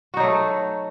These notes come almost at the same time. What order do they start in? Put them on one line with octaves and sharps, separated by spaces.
F#4 D#4 F#3 A3